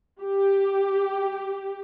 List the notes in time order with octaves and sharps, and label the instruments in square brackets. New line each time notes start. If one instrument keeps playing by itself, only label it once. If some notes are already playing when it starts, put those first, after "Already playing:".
[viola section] G4